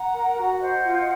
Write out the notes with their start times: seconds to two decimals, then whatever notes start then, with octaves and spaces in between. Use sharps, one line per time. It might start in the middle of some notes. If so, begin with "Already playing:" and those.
Already playing: F#5 A#5
0.14 A#4
0.38 F#4
0.60 C5 D#5 F#5
0.84 F4